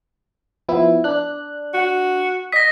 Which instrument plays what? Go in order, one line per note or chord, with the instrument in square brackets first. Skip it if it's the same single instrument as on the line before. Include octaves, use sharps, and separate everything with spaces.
[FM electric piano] F3 B3 E4
D4 F#6
[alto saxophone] F#4
[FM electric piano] D#5 D#6 [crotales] A#6 B6